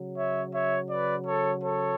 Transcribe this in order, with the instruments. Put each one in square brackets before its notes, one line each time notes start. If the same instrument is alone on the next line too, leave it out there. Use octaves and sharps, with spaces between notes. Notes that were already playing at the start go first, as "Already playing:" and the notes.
Already playing: [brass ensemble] C#3 F#3
C#5 E5
C#5 E5
B4 D5
A4 C#5
A4 C#5